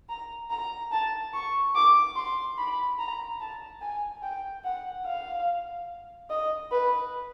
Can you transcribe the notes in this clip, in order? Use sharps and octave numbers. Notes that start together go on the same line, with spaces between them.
A#5
A#5
A5
C#6
D6
C6
B5
A#5
A5
G#5
G5
F#5
F5
D#5
B4